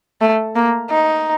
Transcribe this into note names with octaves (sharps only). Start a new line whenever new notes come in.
A3
A#3
D#4